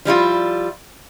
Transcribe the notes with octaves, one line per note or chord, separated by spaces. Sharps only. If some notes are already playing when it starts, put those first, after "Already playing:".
F3 G3 E4 F4